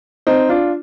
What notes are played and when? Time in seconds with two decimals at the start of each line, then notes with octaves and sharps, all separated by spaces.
0.27 C4 D#4
0.49 D4 F4